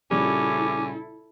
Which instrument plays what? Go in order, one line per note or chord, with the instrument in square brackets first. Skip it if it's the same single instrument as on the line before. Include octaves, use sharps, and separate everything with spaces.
[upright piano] A#1 C#3 G3 [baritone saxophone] C#4 [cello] E4 A4 [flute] D6